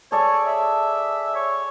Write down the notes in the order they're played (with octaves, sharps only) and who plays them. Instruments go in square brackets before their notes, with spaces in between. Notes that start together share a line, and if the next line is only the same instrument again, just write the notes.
[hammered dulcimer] G#4 A4 D5 [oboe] C#5
[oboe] E5
C#5